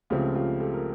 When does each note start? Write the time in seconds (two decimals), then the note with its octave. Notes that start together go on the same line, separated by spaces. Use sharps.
0.10 C#2 C#3 F3 A3 C4 F4 G4
0.35 F4 G4
0.60 G4 A4
0.74 A#4